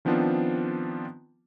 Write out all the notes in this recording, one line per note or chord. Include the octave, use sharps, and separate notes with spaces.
D#3 F3 B3 C4 D4 F4